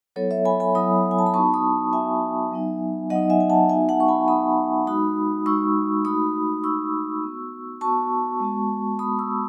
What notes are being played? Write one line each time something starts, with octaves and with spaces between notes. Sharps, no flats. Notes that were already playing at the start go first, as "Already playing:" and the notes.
F#3 B3 E4 A4 C#5
C#5 E5
G#5 B5
G#5 B5
F#3 B3 E4 B5 D#6
G#5
A5
B5
B3 D#4 F#4 A5 C#6
B5 D#6
B3 D#4 F#4 E5 G#5
F#3 B3 D#4
F#3 B3 D#4 D#5 F#5
E5 G#5
G#5
F#5 A5
B3 D#4 F#4 E5 G#5
F#5 A5
C#6
G#5 B5
B3 D#4 F#4 B5 D#6
G#3 D#4 F#4 B5 D#6
G#3 D#4 F#4 C#6 E6
A3 D#4 F#4 B5 D#6
A3 D#4 F#4 C#6 E6
B3 F#4
B3 F#4 A5 C#6
G#3 B3 F#4
G#3 B3 F#4 B5 D#6
C#6 E6